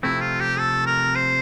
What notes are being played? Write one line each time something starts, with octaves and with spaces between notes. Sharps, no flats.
C3 F3 A3 C4 E4
F4
G4
A4
A#4
C5